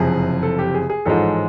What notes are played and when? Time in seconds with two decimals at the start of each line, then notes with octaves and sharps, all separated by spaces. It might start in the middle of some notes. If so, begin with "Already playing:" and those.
Already playing: F#1 F2 C3 G#4
0.43 A4
0.59 G4
0.75 G#4
0.90 G#4
1.05 A1 G#2 F3 G#3 A4